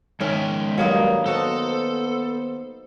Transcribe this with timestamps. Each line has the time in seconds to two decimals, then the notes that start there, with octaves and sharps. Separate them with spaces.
0.20 D#3 G#3 C#4 A#4 C#5 E5
0.78 G2 F#3 G3 A#3 D#4 A#4
1.26 B3 D#4 F#4 A4 C5